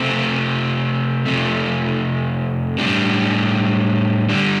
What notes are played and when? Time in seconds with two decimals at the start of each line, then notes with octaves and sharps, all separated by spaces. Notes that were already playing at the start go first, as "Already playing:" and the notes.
Already playing: C3 A3 C4
1.26 F2 C3 A3
2.78 A2 G3 D4
4.29 D3 G3 D4